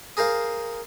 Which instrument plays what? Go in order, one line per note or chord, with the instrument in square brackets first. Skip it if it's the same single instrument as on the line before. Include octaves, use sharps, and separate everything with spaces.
[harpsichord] G#4 A#4 C5 F5